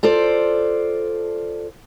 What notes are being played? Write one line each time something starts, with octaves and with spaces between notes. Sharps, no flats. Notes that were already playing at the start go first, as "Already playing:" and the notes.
F4 A4 C5 D5